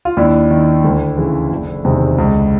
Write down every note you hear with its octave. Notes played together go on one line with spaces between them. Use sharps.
F4
D#2 D4 E4
D#3
D2
C#3 E3
F#1
E2 C3 D#3
C#2